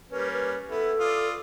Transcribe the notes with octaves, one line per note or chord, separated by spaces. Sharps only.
G3 A#3 C#4 B4
B4
B3 E4 A4
F4 D5 D#6